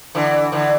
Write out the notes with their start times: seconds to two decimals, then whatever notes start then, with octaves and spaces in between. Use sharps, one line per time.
0.15 D3 E3
0.52 D3 E3